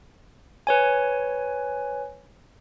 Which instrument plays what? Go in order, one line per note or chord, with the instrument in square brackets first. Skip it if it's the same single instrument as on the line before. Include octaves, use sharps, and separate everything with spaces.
[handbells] B4 C#5 G#5